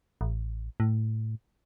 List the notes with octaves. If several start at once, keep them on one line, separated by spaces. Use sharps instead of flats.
A1
A2